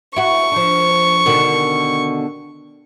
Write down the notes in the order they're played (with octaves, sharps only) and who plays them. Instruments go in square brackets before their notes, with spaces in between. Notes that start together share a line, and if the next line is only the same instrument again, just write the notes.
[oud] E4 F#4 [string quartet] C#6
[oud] F3 D4
B2 D3 D#3